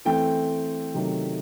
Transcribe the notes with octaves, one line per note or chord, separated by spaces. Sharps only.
E3 A3 C4 G5
C3 D#3 F#3 A3